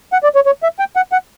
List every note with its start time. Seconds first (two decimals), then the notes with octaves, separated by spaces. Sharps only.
0.13 F#5
0.23 D5
0.35 C#5
0.46 C#5
0.63 E5
0.79 G5
0.96 F#5
1.12 F#5